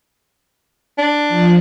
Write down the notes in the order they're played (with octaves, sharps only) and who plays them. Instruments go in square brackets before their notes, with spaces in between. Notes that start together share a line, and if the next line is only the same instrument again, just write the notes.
[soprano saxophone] D4
[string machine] F3